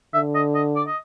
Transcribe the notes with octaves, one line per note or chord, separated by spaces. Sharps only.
D3 E5
D#5
D#5
D5
D#5